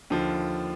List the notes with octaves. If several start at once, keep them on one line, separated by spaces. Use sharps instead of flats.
D#2 D3 F3